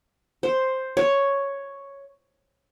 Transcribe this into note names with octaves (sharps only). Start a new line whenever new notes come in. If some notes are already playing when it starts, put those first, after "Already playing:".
C5
C#5